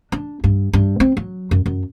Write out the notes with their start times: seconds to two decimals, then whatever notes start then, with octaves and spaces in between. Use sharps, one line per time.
0.12 D4
0.44 G2
0.73 G2
1.00 C4
1.17 F#3
1.51 F#2
1.66 F#2